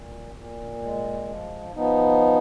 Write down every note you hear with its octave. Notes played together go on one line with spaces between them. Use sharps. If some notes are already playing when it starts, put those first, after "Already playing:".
Already playing: A#2
A#2
G#3
F3
F3 B3 D#4